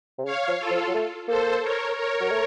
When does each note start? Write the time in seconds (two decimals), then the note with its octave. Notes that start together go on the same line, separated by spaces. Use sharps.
0.18 C3
0.25 C#3 C#5 F5
0.48 F3
0.59 F4 A4
0.70 F3
0.88 F#3
0.94 A3
1.27 A#3 A4 C5
1.62 A#4 C#5
1.96 A#4 C#5
2.21 F#3
2.31 A3